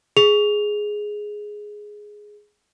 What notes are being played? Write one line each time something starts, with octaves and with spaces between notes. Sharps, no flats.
G#4 F7